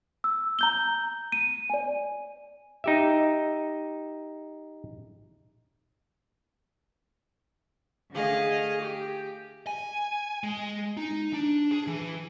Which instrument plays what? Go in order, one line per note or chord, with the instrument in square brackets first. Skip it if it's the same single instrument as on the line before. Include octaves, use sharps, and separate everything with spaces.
[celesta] E6
A#5 G6 G7
D#7
D5 G#5
[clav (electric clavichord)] D#4 G4 E5
[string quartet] D3 A3 G#4 D#5 F5
G4
[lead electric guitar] G#5
G#3
D#4
D4
G#4
E3